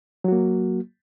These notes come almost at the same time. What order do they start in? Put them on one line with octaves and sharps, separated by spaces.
F#3 F#4 A#3